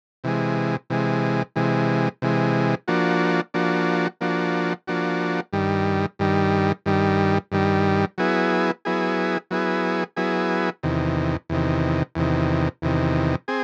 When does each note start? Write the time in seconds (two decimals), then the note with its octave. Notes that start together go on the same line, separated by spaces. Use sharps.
0.24 C3 E3 G#3
0.90 C3 E3 G#3
1.56 C3 E3 G#3
2.22 C3 E3 G#3
2.88 F3 A#3 D4 F#4
3.54 F3 A#3 D4 F#4
4.21 F3 A#3 D4 F#4
4.88 F3 A#3 D4 F#4
5.53 G2 D#3 G3
6.19 G2 D#3 G3
6.86 G2 D#3 G3
7.52 G2 D#3 G3
8.18 F#3 B3 E4 G#4
8.85 F#3 B3 E4 G#4
9.51 F#3 B3 E4 G#4
10.16 F#3 B3 E4 G#4
10.83 E2 C3 D#3
11.49 E2 C3 D#3
12.15 E2 C3 D#3
12.82 E2 C3 D#3
13.48 C4 G#4